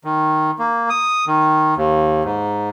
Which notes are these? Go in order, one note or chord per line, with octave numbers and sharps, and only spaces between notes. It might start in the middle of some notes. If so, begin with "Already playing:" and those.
D#3
A#3
D#6
D#3
D#2
G#2